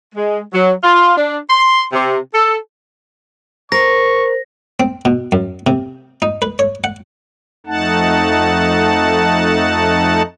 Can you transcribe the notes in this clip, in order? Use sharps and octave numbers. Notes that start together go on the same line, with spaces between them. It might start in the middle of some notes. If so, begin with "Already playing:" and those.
G#3
F#3
F4
D4
C6
C3
A4
A#4 C5 C#6 A#6
C4
B2
F#2
C3
D#4
B4
C#5
F#5
F2 A3 D#4 F#5 A5